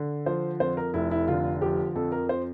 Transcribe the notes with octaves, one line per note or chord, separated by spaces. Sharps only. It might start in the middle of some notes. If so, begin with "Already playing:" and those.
Already playing: D3
F3 C5
F2 C5
A#4
F1 E4
E4
D3 F4
F3 G4
F2 A4
A#4
C5